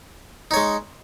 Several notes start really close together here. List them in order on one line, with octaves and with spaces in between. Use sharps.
D#4 C#5 G#3